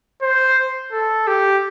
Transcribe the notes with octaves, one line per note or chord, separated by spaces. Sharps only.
C5
A4
G4